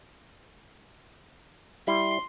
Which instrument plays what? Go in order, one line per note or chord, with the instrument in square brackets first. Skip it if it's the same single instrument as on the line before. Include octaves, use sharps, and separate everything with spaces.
[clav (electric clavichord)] G3 E4 [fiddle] C6